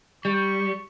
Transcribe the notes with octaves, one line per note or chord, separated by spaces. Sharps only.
G3 C#6